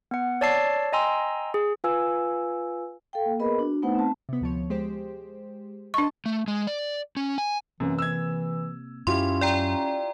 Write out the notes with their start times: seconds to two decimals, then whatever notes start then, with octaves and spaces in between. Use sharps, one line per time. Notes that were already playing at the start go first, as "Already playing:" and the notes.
0.11 B3 F#5
0.41 C#5 D5 A5 E6 C7
0.93 D#5 G5 G#5 A#5 C6 E6
1.54 G#4
1.84 F4 B4 F5 G#5 E6
3.13 A4 F5 G5
3.26 A#3
3.39 B3 G#4 A#4 B4 D#5 B5
3.59 D4 F#4
3.82 A3 B3 D#4 B4 C5 F#5
3.95 C4 A5
4.29 C3 B3
4.41 D2 F3 C#5
4.70 G#3 G4 C5
5.94 D4 D#5 A5 C#6
6.26 A3
6.48 G#3
6.67 D5
7.17 C#4
7.38 G#5
7.80 F#2 C3 E3 A#3 C4
7.98 E6 G#6
9.07 F#2 F#3 C#4 E4 F4 G4 C6
9.41 D5 G5 A#5